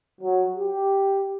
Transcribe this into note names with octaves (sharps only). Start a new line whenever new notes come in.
F#3
G4